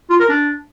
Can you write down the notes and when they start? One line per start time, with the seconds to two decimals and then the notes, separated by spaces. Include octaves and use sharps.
0.10 F4
0.19 A#4
0.29 D4